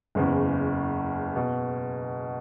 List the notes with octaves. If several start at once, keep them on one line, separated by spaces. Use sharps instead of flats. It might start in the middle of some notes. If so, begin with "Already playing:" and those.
F#1 E2 C#3
B2